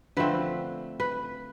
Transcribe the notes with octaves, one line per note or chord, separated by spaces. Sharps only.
D3 F3 A3 C4 B4
B4